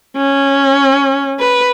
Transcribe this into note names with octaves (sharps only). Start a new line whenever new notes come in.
C#4
B4